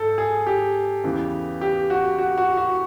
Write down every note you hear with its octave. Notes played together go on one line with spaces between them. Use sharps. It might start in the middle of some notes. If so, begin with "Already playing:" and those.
Already playing: G#2 A4
G#4
G4
E2 C#3 E3
G4
F#4
F#4
F#4
F#4